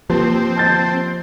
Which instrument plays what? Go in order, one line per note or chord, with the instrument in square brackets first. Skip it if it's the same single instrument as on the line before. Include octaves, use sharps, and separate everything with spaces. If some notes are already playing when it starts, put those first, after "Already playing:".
[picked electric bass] F3 [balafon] A#3 G4 B4 [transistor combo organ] C4
[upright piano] A5 G6 A6